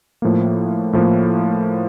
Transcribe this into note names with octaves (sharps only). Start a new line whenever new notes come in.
A2 F3 A#3
A2 F3 A#3